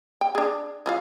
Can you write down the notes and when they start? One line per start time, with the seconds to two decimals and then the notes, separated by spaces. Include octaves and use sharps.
0.21 G5
0.35 D4 G#4
0.86 E3 F4 F5